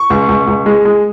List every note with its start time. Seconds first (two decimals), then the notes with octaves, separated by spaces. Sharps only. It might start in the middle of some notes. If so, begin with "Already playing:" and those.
Already playing: C#6
0.10 C#2
0.29 C#2
0.47 C#2
0.66 G#3
0.85 G#3